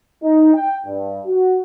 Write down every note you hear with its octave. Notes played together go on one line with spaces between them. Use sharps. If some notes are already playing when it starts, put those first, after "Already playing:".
D#4
G5
G2
F#4